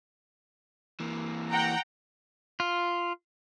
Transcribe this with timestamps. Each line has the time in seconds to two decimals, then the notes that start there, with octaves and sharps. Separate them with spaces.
1.00 E3 A#3
1.50 F#5 G5 A#5
2.60 F4